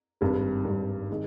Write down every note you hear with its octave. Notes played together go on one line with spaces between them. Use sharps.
G#1 G2 G3
G#1 G2 G3
D#3 G#3 D#4